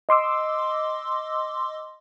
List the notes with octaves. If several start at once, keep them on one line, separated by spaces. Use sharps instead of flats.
D#5 C6 D6 E6